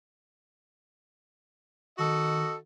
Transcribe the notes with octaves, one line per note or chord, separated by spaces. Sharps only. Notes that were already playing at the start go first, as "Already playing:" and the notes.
D#3 F#4 A4 D#5